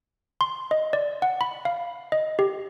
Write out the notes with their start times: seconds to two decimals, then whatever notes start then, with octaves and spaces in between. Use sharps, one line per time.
0.41 C6
0.71 D#5
0.93 D5
1.22 F#5
1.41 B5
1.65 F5
2.12 D#5
2.39 G4